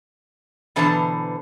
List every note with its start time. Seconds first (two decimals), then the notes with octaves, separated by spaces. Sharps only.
0.76 B2 D3 E3 C5 A5 A#5